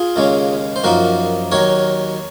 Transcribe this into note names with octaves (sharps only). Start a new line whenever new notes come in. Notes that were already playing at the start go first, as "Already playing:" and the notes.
Already playing: F4 G#4
D#2 C#3 G#3 C#4
C5
F#2 F3 A#3 D#4 F#4 A#4
D#2 D#3 F#3 A#4 C#5